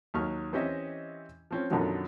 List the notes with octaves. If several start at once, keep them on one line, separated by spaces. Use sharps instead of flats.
D#2 F#3 C#6 F6
E3 C4 C#4 G4 D#5 E5
F3 C4 C#4
F#2 B2 D3 D#3 F3 F#3